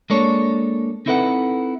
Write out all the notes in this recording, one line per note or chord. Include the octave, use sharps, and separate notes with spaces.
G#3 A#3 D4 A4 C#5
C4 D#4 E4 A4 B4 F#5